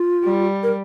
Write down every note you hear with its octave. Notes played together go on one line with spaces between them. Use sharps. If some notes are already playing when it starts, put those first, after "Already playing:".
Already playing: F4
G3
A#4